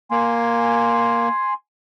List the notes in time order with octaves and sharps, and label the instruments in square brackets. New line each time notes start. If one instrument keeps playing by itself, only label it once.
[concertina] A#3 [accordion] G#5 C6